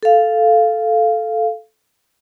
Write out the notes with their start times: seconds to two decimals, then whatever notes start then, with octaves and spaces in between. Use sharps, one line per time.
0.03 A4 F5